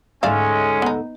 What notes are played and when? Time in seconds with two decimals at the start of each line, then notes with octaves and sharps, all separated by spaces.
0.23 D2 G#2 G#3 A3 C#4 D5 E5 F5
0.82 B3 D#4